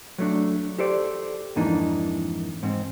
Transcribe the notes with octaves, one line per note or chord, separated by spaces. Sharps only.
F#3 A3 D4
G4 A4 C5 D5
F2 G#2 E3 A#3 D4 D#4
G#2 C4